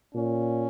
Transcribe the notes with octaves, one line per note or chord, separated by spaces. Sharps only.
A#2 C#4